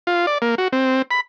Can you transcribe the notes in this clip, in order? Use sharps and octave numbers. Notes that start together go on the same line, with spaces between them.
F4
D5
A#3
F#4
C4
B5